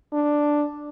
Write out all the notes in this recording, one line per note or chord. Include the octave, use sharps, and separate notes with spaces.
D4